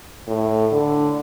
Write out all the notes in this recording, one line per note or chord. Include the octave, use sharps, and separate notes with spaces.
A2
D3